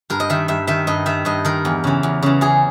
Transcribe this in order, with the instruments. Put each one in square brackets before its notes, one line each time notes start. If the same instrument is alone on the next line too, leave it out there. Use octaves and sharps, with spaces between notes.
[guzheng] G2 A#4
D#5
D#3 E5
G2 E5
D#3 E5
G2 D#5
D#3 E5
G2 D#5
D#3 A#4
E2
C#3 E3
E2
C#3 E3
E2 G#4